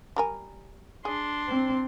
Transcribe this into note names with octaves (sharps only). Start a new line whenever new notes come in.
G3 A#4 G#5
D4 G#4 C6
C4